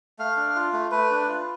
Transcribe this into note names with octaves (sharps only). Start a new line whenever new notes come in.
A3 F5
D4
F4
A3
A3 B4
D4
F4